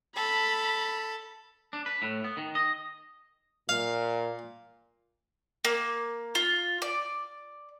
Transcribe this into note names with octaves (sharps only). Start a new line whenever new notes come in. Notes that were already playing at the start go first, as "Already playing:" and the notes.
A4 B5
D4
B4
A2
B3
D#3
D#5
A#2 F5
A#3
F4
D5